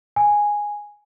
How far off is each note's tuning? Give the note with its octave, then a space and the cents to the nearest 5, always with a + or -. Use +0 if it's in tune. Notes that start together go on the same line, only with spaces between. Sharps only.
G#5 -5